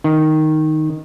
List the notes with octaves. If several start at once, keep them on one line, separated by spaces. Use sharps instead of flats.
D#3